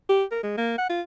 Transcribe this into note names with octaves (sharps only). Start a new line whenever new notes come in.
G4
A#4
G#3
A#3
F#5
F4